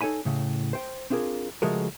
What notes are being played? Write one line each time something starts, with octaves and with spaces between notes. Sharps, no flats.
D#4 A4 C#5 G#5 B5
A2 C#3
C5 G5
C4 D4 F4 G#4 A#4
C#3 F3 G#3 A3 F#4 A#4